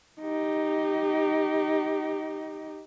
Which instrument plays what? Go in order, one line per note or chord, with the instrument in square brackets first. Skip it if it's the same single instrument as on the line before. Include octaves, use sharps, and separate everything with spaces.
[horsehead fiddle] D#4 G4